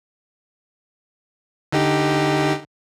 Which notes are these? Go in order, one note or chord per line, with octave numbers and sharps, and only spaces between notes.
D3 D#4 G4